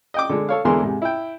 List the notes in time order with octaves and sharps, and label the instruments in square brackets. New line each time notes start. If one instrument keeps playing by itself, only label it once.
[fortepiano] D#5 G5 D6
D3 G#3
A4 C#5 F5
E2 D3 E3 G#3 A#4 C6
G#2 C3
E4 G5